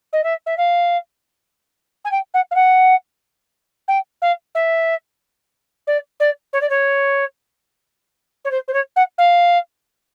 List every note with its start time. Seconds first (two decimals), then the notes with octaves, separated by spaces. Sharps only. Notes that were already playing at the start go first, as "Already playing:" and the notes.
0.12 D#5
0.23 E5
0.46 E5
0.57 F5
2.04 G#5
2.11 G5
2.34 F#5
2.51 F5
2.55 F#5
3.88 G5
4.22 F5
4.55 E5
5.87 D5
6.20 D5
6.53 C#5
6.61 D5
6.69 C#5
8.44 C#5
8.51 C5
8.68 C5
8.73 C#5
8.96 F#5
9.18 F5